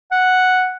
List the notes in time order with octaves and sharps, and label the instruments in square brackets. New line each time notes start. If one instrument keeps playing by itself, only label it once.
[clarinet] F#5